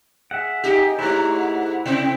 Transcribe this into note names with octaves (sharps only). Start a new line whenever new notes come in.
G#4 E5 F#5
D#4 G4 G#4
G#2 A3 E4 C#5 A#5
F#5
C3 C4 E4 G5